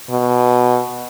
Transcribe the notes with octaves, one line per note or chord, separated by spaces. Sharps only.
B2